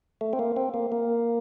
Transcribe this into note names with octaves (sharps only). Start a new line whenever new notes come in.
A3
C4
A#3
C4
A#3
A#3